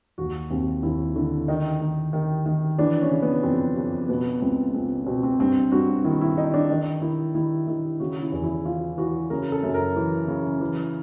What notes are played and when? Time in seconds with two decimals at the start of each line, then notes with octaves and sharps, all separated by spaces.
0.18 D#2 F#4
0.50 D#2 C4
0.83 D#2 E4
1.16 D3 E4
1.48 D#3 D#4
1.81 D#3
2.13 D#3
2.46 D#3
2.78 E3 D4
3.01 C#4
3.11 C#3
3.22 B3
3.43 F2 C4
3.77 F2
4.09 B2 B3
4.41 C#2 C4
4.74 C#2 C4
5.06 B2 C4
5.23 C4
5.39 G2 C4
5.72 G2 F#4
6.04 D#3 E4
6.21 E4
6.37 D#3 D#4
6.54 D4
6.70 D#3 D#4
7.02 D#3 E4
7.35 D#3 E4
7.67 D#3 E4
8.00 C#3 F#4
8.22 E4
8.32 E2
8.44 E4
8.65 E3 F4
8.98 E3 F#4
9.30 C#3 A#4
9.52 A4
9.63 F#2
9.74 A#4
9.96 E3
10.28 C#3
10.60 E3